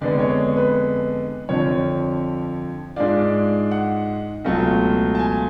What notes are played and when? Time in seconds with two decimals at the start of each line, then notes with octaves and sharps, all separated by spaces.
0.01 F2 D3 G#3 B3 D5
0.19 C#5
0.57 B4
1.49 F2 D3 F3 C#5
2.96 G#2 G#3 D4 F4 D5
3.71 F#5
4.44 C#2 B2 F#3 A3 F4
5.15 A5
5.19 G#5